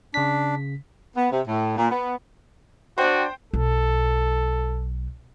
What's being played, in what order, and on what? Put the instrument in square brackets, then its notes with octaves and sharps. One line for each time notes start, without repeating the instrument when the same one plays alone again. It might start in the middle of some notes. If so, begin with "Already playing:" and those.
[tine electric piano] C#3 B6 [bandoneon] D4
[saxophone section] B3
C3
A2
A#2
B3
[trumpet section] D4 F#4 [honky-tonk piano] C5 G5
[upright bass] B1 [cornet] A4